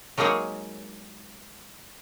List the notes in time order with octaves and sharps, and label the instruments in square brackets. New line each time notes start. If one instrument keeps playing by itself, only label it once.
[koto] F#3 G#3 A#3 D#4 G#4 C#5